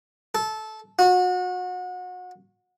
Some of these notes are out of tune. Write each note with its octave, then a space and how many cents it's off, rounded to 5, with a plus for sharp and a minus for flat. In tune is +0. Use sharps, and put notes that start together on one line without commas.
A4 -15
F#4 -30